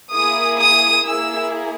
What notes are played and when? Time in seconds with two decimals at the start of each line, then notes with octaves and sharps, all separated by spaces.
0.12 A#3 E4 G#4 D#6
0.58 D#6
1.04 A#3 E4 G#4 E6